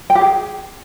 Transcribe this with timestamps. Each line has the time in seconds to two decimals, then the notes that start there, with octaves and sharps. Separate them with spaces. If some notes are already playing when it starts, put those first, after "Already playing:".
0.10 G5
0.15 G4
0.21 G#4